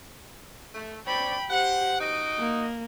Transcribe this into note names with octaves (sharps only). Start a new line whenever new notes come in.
A3
C4 C#5 D5 G5 B5
G4 C5 F#5
D#4 F#4 D#5 D7
A#3